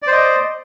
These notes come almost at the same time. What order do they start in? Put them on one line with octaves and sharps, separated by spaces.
D5 C5 D#5